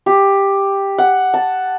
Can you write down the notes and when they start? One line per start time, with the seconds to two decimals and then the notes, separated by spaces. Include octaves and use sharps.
0.06 G4
0.98 F#5
1.34 A5